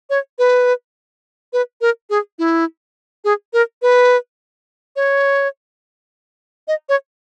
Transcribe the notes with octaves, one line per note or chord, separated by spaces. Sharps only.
C#5
B4
B4
A#4
G#4
E4
G#4
A#4
B4
C#5
D#5
C#5